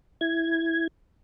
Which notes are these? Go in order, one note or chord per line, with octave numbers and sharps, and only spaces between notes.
E4 G#6